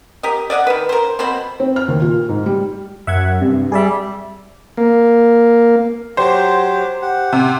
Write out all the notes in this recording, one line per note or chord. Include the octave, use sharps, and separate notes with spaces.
G4 A#4 D#5
D5 D#5 F5 F#5
D#3 B4
A#4 C5
B2 C4 C5 B5
C4
F6
D#2
A#2
G#2
G3
F#2 E5 F#5 G#6
G2 C3
G3 G#4 D5 E5
A#3
F#3 G4 C5
G4 F#5
C3